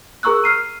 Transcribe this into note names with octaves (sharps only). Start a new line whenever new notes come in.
G#4 A#4 A#5 C#6 E6 F#6
F6 C7 D#7